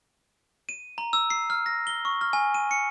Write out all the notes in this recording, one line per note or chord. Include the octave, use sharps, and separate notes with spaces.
D#7
A#5
E6
C7
F6
A#6
G7
C#6
F6
G#5
D#7
C#7